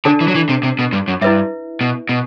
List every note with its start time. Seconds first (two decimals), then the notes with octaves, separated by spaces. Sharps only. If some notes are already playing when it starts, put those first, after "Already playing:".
0.05 D3 D4 A4 D5 A5
0.21 E3
0.28 F#3
0.35 E3
0.49 C3
0.63 C3
0.79 B2
0.92 G2
1.08 F#2
1.21 G2 E4 B4 E5
1.81 B2
2.09 B2